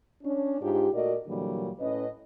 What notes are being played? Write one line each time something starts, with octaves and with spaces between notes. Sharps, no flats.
C#4 D4
G#2 D4 F4 G4
A#2 A3 F#4 A#4 D5 D#5
A#2 D3 E3 F#3 G3 A#3
A2 C#4 B4 D#5